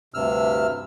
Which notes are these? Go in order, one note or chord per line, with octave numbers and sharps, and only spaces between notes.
D2 G2 C3 E6 F6